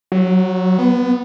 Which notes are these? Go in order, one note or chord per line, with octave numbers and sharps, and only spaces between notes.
F#3
B3